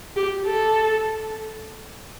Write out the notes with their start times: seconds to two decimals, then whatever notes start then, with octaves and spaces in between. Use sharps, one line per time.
0.16 G4
0.46 A4